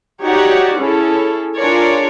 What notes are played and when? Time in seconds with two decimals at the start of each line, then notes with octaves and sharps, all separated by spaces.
0.22 D#4 F#4 G4 C#5 D5 F#5
0.76 C#4 E4 G#4 A4
1.56 D4 F4 G#4 A#4 C#5 D5